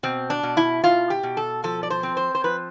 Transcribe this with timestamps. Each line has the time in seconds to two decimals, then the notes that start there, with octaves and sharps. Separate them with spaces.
0.03 B2 C4
0.30 D4
0.43 B2
0.57 E4
0.84 B2 F4
1.10 G4
1.23 B2
1.37 A4
1.64 F3 A4
1.83 D5
1.90 C5
2.03 C4
2.17 C5
2.35 C5
2.44 F3 B4